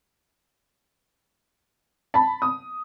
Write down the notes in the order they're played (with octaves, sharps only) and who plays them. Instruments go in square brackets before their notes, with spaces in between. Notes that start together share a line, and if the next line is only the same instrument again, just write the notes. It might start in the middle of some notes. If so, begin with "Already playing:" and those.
[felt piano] A5 B5
D#6